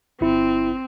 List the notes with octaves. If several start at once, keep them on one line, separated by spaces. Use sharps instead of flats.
G1 C4 E4